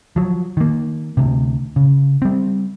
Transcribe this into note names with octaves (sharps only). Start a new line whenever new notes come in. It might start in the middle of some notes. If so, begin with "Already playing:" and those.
F3 F#3
D#3 A#3
D2 C3
C#3
G3 C4